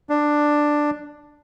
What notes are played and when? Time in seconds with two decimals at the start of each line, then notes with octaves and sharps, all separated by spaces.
0.10 D4